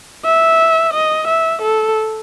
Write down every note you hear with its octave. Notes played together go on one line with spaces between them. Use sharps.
E5
D#5
E5
A4